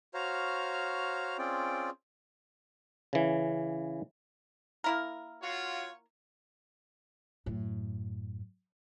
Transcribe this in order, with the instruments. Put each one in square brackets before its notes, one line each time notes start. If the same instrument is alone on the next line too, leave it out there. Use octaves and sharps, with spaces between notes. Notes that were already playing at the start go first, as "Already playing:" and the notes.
[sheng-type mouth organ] F#4 C5 C#5 F5 A#5 F6
C4 C#4 F4 G#4 D5 G5
[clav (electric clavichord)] C#3 E3
[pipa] A#3 E4 A#4
[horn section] F4 F#4 C#5
[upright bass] F#2 A2